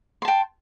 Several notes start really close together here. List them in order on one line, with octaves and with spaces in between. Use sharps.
C6 A5 G5